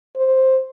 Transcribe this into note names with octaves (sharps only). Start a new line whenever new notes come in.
C5